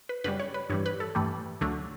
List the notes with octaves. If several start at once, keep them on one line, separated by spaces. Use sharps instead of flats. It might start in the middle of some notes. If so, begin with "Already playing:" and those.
B4
F#2 C#3 G3 B4
C#5
B4
G2 E3 G3 C#5
B4
A4
G2 E3 A3 G4
D2 D3 F#3 A3